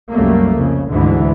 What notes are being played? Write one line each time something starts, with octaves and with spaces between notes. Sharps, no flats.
C2 F#2 G3 A3 A#3
F2 C#3
D2 G#2 D3 E3